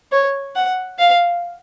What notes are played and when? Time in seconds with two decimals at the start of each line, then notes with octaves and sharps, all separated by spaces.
0.12 C#5
0.55 F#5
0.99 F5